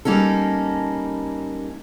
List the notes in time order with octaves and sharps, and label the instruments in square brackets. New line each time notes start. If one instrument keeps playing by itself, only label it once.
[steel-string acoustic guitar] G3 A#3 C#4 D#4 A4